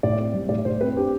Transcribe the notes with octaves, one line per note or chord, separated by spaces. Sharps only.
A2 D5
C4
G3
A2 D5
A2 C5
C4 B4
D4 G4